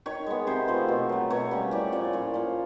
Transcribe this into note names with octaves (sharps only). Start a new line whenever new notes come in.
D#3 C#5
G#3 B3
C3 C5
F3 A3
B2
F#3 A3
B2 C#5
G3 A#3 C#4
A2 D5
F3 A3 C#4 D5
A#2 C#5
F3 A#3